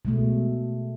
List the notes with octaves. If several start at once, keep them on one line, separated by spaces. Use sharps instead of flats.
B2 G#3 A3